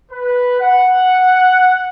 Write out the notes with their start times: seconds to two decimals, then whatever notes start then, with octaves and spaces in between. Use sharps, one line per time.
0.12 B4
0.61 F#5